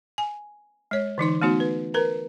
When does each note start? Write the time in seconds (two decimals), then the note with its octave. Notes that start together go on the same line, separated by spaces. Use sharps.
0.18 G#5
0.91 G#3 C#5
1.18 D3 E3 D#4 D6
1.42 A3 B3 D#4 F#4
1.60 B4
1.94 A#4 B4 A#5